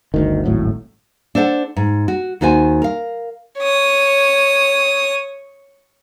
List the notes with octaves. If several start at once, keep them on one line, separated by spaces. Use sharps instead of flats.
G1 D2 D#3
D#1 G#1 A2 F#3
D4 A4 C5 F5 F#5
G#2
F#4
D#2 D#3 F#4 C5 G#5
A#4 F5
C#5 D#6